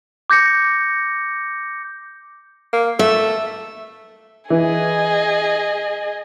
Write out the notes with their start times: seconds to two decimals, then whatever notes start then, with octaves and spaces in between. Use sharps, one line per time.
0.30 D6 G6 A#6 C#7
2.73 A#3
2.99 A3 E5
4.50 E3 G#4 D#5